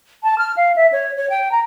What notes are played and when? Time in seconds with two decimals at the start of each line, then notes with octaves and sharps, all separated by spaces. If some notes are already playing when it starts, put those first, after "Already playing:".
0.23 A5
0.38 F6
0.56 F5
0.76 E5
0.92 C#5
1.16 C#5
1.29 G5
1.51 A#5